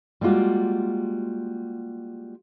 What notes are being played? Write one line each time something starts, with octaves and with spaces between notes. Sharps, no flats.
G3 G#3 A#3 F4 F#4